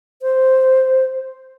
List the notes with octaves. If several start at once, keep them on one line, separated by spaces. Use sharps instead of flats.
C5